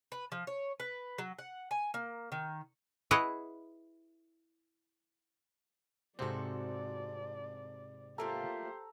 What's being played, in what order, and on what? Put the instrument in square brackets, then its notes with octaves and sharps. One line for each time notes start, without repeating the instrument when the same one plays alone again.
[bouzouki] B4
F3
C#5
B4
F#3
F#5
G#5
A#3
D#3
[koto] E4 G#4 B4 C#5 D#5 F#5
[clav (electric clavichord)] G#2 C3 C4 [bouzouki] F#4 A4 [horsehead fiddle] D5
[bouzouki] A3 A#3 F4 [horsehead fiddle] G4 C5 [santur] A4 A#5